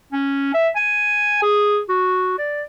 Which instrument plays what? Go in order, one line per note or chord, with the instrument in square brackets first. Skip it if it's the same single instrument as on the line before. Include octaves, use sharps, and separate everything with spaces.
[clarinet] C#4
E5
G#5
G#4
F#4
D5